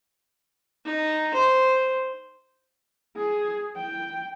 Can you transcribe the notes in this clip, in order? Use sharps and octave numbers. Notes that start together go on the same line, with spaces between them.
D#4
C5
G#4
G5